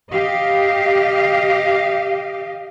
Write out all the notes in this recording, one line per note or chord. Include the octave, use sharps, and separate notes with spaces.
G4 D#5 F5